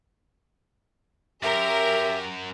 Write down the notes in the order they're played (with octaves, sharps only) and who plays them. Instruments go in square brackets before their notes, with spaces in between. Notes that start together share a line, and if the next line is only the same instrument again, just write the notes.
[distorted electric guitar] F#2 [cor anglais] G4 [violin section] A#4 [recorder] E5